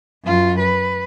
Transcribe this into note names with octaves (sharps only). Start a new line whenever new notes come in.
F#2 F4
B4